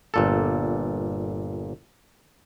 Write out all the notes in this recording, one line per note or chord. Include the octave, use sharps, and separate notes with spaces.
G1 A#2 A4